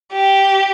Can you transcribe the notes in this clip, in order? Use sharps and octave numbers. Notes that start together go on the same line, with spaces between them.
G4